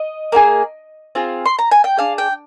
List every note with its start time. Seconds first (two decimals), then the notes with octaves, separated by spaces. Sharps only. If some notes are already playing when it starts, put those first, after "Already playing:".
Already playing: D#5
0.32 A#3 F4 G#4
1.15 C4 F4 G#4
1.46 C6
1.59 A#5
1.71 G#5
1.84 G5
1.97 D4 G#4 F5
2.18 G5